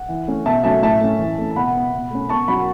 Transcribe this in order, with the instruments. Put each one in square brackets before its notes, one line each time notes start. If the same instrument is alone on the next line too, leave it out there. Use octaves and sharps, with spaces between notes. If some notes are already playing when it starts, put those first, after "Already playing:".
Already playing: [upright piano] F#5
E3
A3 C#4
B2 E5 A5
F#3 A3 C#4 E5 A5
A2 E5 A5
A3 C#4
E3
A3 C#4
A5
B2 F#5 B5
B3
B2
A3 C#4
B2 A5 C#6
F#3 C#4 F#5 B5